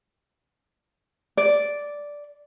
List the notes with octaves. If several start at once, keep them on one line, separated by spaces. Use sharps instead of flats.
D5